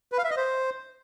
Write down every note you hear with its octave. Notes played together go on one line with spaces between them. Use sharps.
B4
F5
E5
D#5
C5